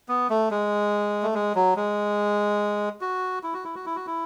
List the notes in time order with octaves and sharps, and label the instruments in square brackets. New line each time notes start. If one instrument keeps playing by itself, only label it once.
[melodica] B3
A3
G#3
A3
G#3
F#3
G#3
F#4
E4
F#4
E4
F#4
E4
F#4
E4